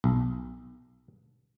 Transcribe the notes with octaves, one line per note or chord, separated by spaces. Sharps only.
B1